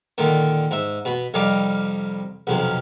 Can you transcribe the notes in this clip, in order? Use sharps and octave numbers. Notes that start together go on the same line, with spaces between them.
A#2 D3 D#3
G#2 E5
B2 B5
C2 F2 G3 D#4 G4 F5
B1 F2 C3 F5